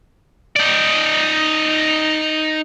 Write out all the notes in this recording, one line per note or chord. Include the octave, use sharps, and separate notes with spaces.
D#4 D5